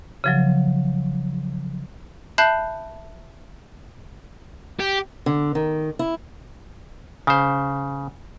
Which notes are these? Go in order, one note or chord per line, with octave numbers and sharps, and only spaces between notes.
C#3 F3 F#3
E5 A5 B5 F#6 G6 C7
G4
D3
D#3
E4
C#3 C5